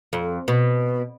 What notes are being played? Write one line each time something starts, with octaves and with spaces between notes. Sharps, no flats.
F2
B2